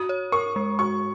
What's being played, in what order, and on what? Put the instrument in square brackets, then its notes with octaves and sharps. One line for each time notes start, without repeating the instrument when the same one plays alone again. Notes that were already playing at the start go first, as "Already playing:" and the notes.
Already playing: [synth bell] F#4 [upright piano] D#6
[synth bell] C#5
[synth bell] A#4 [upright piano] C#6
[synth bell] G#3
[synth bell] F#4 [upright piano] C#6